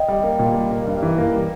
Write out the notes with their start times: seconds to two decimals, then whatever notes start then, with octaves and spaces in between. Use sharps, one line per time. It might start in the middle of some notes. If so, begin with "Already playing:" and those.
Already playing: D#5 G5
0.08 G3
0.23 A#3
0.39 A#2
0.54 G3
0.71 A#3
0.87 G2
1.02 E3
1.18 A#3
1.33 G3